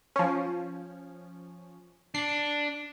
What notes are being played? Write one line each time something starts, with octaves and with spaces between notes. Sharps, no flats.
F3 C#4
D4 C7